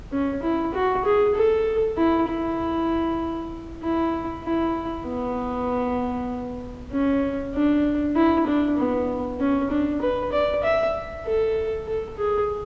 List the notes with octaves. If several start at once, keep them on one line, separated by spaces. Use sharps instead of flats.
C#4
E4
F#4
G#4
A4
E4
E4
E4
E4
B3
C#4
D4
E4
D4
B3
C#4
D4
B4
D5
E5
A4
A4
G#4